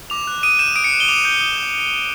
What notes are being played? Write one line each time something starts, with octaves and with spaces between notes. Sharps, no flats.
D6 F7
F#6
D#6 D#7
G6 E7
D#6 D7
C#7
F#6
G7
D6 F7
G6
D#6
G6